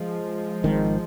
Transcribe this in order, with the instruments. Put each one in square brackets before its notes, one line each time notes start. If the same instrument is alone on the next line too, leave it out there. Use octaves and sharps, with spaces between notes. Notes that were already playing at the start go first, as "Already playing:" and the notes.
Already playing: [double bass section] F3 G#3
[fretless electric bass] G#1 G#2 D#3